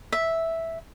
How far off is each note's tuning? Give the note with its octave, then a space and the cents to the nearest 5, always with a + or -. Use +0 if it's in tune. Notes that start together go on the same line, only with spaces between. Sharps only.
E5 -5